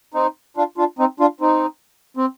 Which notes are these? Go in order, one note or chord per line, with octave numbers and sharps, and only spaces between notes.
C4 D#4
D4 F4
D4 F4
C4 D#4
D4 F4
C4 D#4
C4